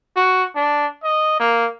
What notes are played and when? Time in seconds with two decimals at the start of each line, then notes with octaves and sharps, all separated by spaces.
0.16 F#4
0.56 D4
1.04 D#5
1.40 A#3